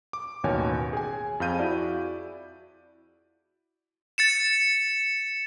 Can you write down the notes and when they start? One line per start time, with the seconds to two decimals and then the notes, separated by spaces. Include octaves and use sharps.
0.13 D6
0.44 A1 D#2 B2 C#5 G#5
0.93 G#4 G#5
1.40 F2 G#4 F5 G6 D#7
1.59 E4 F#4 D5
4.18 A6 C#7 E7